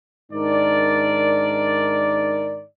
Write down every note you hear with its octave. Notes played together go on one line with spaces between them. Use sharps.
G#2 D#3 D4 A#4 D5